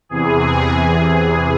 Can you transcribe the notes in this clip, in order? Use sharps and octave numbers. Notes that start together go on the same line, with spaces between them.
E2 C3 E3 G#4